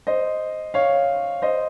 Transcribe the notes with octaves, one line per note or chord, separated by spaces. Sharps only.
C5 D#5
C#5 F5
C5 D#5